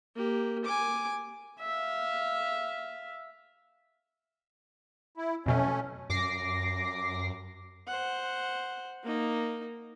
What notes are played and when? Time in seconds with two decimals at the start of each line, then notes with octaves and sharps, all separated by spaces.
0.15 A#3 G4
0.65 G#5 D6
1.60 E5 F5
5.17 E4
5.46 F2 B2 F#3 A3 C#4
6.10 F#2 D6 A#6 C7
7.87 C5 F#5
9.04 A#3 D#4